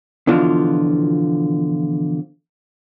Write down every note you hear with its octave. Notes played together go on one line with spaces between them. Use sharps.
B2 D3 E3 F3 D4 F4